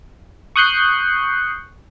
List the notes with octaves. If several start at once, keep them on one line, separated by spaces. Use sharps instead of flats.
C#6 D#6 F#6 G6 C7 C#7